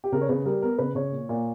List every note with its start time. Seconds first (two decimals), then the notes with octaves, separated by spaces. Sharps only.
0.04 G4
0.12 C#3 A#4
0.21 C#5
0.29 C#3 B4
0.45 G3 A#4
0.62 B3 A#4
0.78 C#3 B4
0.95 C#3 C#5
1.12 A#2
1.29 A#2